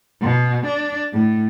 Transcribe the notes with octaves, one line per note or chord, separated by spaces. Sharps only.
B2
D4
A2